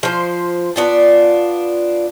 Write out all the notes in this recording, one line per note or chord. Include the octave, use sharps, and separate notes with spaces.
F3 C5
B3 D4 F4